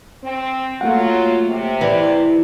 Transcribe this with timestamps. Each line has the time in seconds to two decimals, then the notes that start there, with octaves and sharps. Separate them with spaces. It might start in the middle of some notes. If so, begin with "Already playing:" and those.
0.23 C4
0.81 F#3 A3 A#3 F4 F#5
1.48 C3
1.81 E3 B4 D5